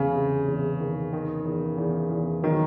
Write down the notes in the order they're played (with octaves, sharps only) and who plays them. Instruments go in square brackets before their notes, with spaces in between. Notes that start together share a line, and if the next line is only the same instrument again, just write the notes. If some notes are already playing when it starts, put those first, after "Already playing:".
Already playing: [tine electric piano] E2 [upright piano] C#3
[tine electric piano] C3
E2
D#3
D#3
E2
E2
E2
[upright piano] D#3 [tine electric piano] F#3